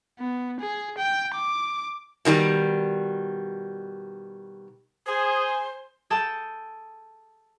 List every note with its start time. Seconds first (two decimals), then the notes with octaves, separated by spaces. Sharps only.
0.19 B3
0.60 G#4
0.98 G5
1.35 D6
2.25 B2 D#3 F#3 G3
5.06 G#4 C5
6.10 G#4 A4 G5 A5